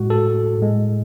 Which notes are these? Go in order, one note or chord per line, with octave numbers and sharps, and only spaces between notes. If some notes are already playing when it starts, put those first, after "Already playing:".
Already playing: A2 G#3 F#4
A4
A2 G#3